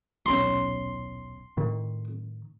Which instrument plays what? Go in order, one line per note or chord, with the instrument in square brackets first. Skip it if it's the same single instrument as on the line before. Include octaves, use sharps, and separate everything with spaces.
[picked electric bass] D#1 B1 C#4 [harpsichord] C6
[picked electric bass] A2 D#3